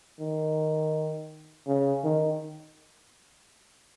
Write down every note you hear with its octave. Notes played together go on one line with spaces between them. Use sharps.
D#3
C#3
D#3